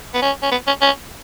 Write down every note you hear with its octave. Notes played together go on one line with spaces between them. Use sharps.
B3
C#4
C#4
B3
C#4
C#4